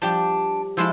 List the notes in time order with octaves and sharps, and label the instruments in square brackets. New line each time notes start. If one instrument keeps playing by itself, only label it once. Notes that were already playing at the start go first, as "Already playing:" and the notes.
[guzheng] F3 G3 G4 [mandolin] D4
[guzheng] F3 G#3 E4 [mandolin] F4 A4